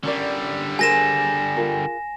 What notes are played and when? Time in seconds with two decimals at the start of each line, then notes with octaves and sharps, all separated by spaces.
0.03 D3 G3 C#4 A#4 D5
0.79 G#4 A#4 C5 G#5 A#6 E7
1.57 F4 G#4 A#4